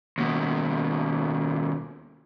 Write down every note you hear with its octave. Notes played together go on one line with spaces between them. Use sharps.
D#2 B2